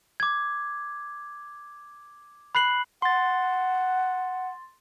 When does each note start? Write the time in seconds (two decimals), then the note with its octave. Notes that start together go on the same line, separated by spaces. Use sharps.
0.20 D6 G#6
2.55 B5 F#6 C7 F#7
3.02 F#5 C6 A6